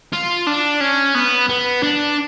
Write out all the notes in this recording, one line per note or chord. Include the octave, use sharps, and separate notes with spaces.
F4
D4
C#4
B3
B3
D4